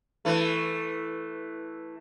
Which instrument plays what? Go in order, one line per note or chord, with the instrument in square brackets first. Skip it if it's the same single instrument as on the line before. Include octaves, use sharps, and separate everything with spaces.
[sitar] E3 A3